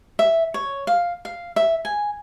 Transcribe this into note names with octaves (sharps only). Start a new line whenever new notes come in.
E5
C#5
F5
F5
E5
G#5